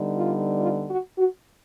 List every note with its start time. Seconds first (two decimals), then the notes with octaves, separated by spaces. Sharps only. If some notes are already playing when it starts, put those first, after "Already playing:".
Already playing: D3 G3 B3 D#4
0.16 F4
0.59 F4
0.88 F#4
1.17 F#4